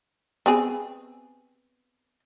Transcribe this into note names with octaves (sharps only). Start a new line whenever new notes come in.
B3 C4 G#4